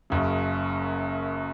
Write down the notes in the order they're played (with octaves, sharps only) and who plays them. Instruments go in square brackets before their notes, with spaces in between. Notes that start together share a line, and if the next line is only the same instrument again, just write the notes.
[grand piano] F#1 F#2 C#3